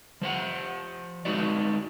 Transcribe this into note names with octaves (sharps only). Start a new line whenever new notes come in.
F3 C5 F#5
G#3 D#4 F#4 D5